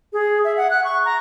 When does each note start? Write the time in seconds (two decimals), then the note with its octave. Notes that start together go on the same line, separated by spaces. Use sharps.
0.13 G#4
0.44 E5
0.57 F#5
0.70 F#6
0.84 C#6
1.05 A#5